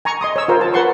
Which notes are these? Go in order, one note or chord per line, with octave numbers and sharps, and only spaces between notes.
G#5 A#5 C#6
D#5 C6 D#6
C#5 E6
F4 A#4 C5
A5
A#4 B4 F#5 A5 C6 C#6